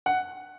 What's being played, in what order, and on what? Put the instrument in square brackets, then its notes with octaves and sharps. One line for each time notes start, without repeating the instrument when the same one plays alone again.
[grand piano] F#5